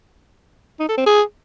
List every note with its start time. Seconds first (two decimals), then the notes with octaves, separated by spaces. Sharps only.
0.80 D#4
0.89 A4
0.98 C4
1.06 G#4